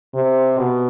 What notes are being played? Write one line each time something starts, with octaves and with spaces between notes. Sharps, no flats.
C3
B2